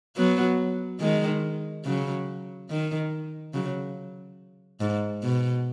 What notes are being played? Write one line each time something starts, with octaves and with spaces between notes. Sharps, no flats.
F#3 B3
D#3 G#3
C#3 F#3
D#3
C#3 F#3
G#2
B2